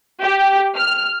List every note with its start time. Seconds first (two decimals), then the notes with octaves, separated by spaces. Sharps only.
0.22 G4
0.76 F6